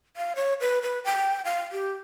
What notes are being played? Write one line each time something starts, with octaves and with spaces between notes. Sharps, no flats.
F5
C#5
B4
B4
G5
F5
G4